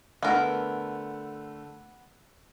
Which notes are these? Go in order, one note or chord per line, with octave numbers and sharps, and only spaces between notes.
D3 A3 B3 A#4